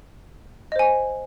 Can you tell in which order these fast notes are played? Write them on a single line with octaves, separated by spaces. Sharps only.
D#5 C5 G#5